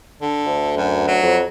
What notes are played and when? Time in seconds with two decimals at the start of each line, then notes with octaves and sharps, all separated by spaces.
0.22 D3
0.46 D2
0.76 F#2
1.07 F#3
1.22 F2